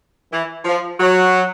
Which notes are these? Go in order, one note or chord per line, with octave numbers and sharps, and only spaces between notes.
E3
F3
F#3